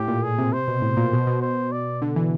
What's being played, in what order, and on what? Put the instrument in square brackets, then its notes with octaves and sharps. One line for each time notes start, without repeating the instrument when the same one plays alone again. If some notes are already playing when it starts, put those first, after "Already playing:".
Already playing: [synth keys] A2 [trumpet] G4
[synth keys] A#2
[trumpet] G#4
[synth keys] C3
[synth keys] C3 [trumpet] C5
[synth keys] B2
A2
A#2
B2
B2
[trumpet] C5
D5
[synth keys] D3
E3